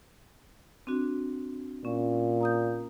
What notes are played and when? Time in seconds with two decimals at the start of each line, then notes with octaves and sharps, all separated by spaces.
0.87 C4 D4 F#4
1.85 A#2 C#4
2.41 A#5 D#6 G6